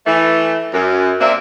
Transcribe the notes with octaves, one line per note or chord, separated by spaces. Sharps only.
E3 A3
F#2
C3 A#3 C4 D4 D5 E5